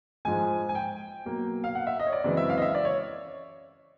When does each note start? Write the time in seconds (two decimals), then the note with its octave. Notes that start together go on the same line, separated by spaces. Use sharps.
0.25 G#2 F3 G#3 G#5
0.69 G#5
0.75 G5
1.25 B2 F#3 A#3
1.64 F5
1.75 F#5
1.87 E5
1.99 D#5
2.07 C#5
2.13 D5
2.24 F#2 C#3 E3 G#3 C4 D5
2.37 E5
2.50 F5
2.58 D#5
2.62 E5
2.75 D5
2.85 C#5